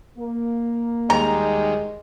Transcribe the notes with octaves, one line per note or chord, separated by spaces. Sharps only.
A#3
D#2 G3 G#3 A#5